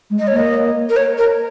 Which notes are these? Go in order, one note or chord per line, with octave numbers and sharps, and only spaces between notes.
G#3
D#5
C#5
A#3 D#5
A#4
C#5
A#4